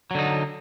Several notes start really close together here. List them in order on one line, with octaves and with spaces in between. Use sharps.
F#3 D3 D#4